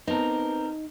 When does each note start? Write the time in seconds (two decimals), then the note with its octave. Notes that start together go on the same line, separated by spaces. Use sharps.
0.07 B3 C4 D#4 A#4 A5